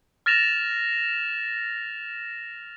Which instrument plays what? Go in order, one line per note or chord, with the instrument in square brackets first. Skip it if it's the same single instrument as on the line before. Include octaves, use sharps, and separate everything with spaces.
[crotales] F6 A6 A#6 E7 F7